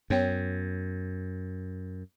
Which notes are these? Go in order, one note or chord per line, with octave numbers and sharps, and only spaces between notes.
F#2 B3 C#5 G5